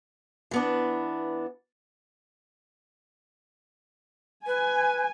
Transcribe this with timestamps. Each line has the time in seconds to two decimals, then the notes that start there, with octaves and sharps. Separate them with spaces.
0.51 E3 B3 D4
4.47 B4 G#5